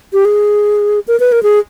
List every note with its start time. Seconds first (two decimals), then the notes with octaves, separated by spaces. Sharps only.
0.13 G4
0.25 G#4
1.08 A#4
1.20 B4
1.32 A#4
1.43 G#4